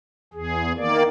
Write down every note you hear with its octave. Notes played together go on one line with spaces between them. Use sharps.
E2 G#4
D#3 A#3 D5